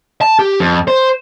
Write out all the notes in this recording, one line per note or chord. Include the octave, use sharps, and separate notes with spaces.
A5
G4
F2
C5